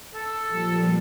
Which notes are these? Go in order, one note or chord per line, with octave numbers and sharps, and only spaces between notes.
A4
A#2 F3 G3